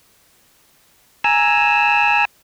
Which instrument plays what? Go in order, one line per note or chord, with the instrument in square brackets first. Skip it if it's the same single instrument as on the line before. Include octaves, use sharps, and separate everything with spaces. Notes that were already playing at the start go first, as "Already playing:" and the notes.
[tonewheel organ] G#5 A#5 E6